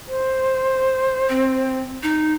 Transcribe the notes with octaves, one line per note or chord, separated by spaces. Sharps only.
C5
C4
D#4